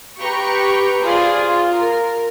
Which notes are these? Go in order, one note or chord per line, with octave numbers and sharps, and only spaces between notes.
G4 B4 G5 A#5 C#6
F4 G#4 C5 D5
F4
A#4